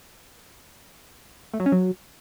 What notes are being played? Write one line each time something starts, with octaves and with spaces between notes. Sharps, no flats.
A3
F#3
C#4
F#3